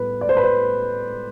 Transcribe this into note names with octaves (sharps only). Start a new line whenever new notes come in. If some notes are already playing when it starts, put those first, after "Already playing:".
Already playing: A2 G3 B3 B4
D5
C5
B4
C5